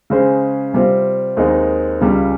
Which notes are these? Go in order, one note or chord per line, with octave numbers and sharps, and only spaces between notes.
C#3 G#3 C#4 G#4 C5
C3 G3 C4 F4
D#2 D#3 G#3 C4 D#4
C#2 C#3 G3 C#4